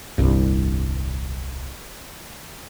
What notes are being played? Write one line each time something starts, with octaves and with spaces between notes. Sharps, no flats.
D#1 C2 G2